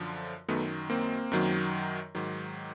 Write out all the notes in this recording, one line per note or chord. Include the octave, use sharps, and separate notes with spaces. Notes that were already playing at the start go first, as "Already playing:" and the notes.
Already playing: F#2 D3 F3
F#2 D#3 F#3 A3 B3
A#3 C4
F#2 D#3 F#3
G#2 D#3 F#3